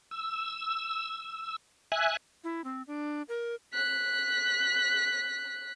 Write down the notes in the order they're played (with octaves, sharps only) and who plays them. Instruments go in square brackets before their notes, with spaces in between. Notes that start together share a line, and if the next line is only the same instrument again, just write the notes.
[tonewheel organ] E6
E5 G#5 F#6
[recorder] E4
C4
D4
A#4
[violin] F#6 B6